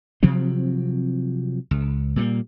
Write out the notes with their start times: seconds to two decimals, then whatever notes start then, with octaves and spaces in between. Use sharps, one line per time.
0.23 C3 F3 F#3 C4
1.71 C#2
2.16 A#2 G3 G#3 A#3